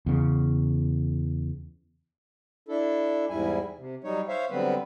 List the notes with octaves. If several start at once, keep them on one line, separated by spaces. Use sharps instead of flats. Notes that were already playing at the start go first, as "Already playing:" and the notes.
E2 C#3
D4 E4 A4
E2 G#2 G3 E4 G#5
C3
F#3 G3 D#4 C#5
C5 C#5 E5 F5
D3 F#3 G3 B3 C4 B4